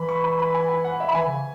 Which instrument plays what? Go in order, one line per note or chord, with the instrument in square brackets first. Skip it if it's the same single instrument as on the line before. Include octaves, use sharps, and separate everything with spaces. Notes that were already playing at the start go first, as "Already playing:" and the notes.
Already playing: [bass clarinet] E3 [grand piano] B5
[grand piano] C#6
B5
B5
G#5
G#5
F#5
E5
B5
[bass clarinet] E3 [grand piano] G#5
[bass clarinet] C#3